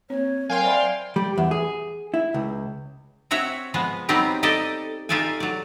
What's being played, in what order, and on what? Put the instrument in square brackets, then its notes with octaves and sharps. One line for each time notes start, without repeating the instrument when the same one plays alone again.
[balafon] A#3 C4 [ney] C#5
[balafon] F#3 [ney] A#4 [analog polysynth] F5 G5 C6 [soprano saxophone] G#5
[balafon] C5 E5 B5 [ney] D5
[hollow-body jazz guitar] G3
E2
G#4
E4
C#2
[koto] C4 F#4 C#5 E5 F#5
F3 G#3 B3
F#3 G3 B3 C4 D#4 G4
D#4 G4 A4 D5 D#5
D#4 F4 G4 A4 D5 G#5
F#3 D5